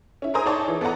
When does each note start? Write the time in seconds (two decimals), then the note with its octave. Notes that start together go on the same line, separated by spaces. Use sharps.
0.22 C#4 E4
0.34 G#4 A#4 C5 G#5 A#5 D#6
0.46 D#4 G#4 C#5 D5 A5
0.68 E3
0.81 B3 A4 D5 F#5 A#5